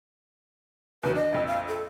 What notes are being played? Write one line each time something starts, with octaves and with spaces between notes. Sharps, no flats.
E2 D#3 F#3 B4
D4 D#5
A#1 F2 E6
F5
A4